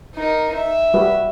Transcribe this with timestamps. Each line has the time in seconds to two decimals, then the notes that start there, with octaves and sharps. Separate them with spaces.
0.15 D#4 A#4
0.55 E5
0.94 G3 F#4 B4